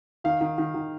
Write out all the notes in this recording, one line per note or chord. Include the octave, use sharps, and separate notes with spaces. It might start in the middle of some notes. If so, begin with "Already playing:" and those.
D#3 F5
D#3
D#3
D#3